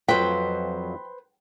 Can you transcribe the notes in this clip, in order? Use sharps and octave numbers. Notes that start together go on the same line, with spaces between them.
F2 F3 F#3 B4 C5 G5